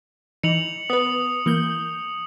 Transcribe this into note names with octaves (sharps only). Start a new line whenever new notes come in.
E3 D#4 C#7 F7 F#7
B3 B4 D#6
E3 A#3 G6